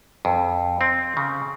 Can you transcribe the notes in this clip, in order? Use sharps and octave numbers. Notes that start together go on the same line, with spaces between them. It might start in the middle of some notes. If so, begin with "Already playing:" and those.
F2
C4
C#3